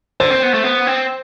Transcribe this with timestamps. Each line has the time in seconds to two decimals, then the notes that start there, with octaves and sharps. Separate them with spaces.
0.20 D3 C5
0.31 C4
0.43 B3
0.54 A3
0.64 B3
0.87 C4